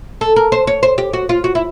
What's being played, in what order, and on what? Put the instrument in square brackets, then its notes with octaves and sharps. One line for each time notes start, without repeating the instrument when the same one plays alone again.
[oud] A4
A#4
C5
C#5
C5
G4
F#4
F4
F#4
E4